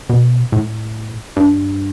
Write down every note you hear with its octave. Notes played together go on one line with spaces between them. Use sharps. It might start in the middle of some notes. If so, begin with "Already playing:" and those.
B2
A2
G2